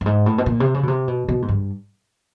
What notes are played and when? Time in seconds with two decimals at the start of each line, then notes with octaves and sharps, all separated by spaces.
0.01 G2
0.06 G#2
0.26 A2
0.38 B2
0.46 A#2
0.60 C3
0.74 C#3
0.83 B2
0.88 C3
1.08 B2
1.29 B2
1.42 G#2
1.49 G2